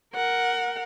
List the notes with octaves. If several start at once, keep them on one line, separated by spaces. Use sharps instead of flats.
A#4 F#5